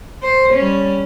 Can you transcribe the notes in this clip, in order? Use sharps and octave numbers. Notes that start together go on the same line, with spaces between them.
C5
G3 C#4